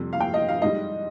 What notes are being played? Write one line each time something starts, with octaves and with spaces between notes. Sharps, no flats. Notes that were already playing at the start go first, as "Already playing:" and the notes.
Already playing: F2 C3 G3
F5
G5
D#5
F5
G#2 G3 D#5